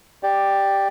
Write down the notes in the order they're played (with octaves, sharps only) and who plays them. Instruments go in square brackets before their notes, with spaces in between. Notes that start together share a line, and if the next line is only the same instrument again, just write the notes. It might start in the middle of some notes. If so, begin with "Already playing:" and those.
[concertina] G4 D5